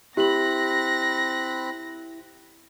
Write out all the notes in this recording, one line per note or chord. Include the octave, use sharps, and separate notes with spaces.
C4 E4 G4 B5 F#6 A#6 F#7